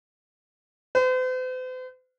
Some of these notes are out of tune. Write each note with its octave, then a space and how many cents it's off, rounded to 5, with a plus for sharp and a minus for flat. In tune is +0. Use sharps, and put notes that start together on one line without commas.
C5 -45